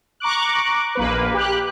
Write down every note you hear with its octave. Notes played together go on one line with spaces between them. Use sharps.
A#5 C#6 D6 F#6
A#1 A#3 B4
G4 F#6